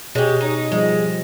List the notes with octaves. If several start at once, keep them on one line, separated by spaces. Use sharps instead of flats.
B2 G#3 G4 G#4 C#5
D#4
F3 G3 G#3 D#5